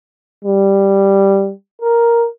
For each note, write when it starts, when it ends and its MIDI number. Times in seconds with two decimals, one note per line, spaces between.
0.44 1.51 55
1.82 2.26 70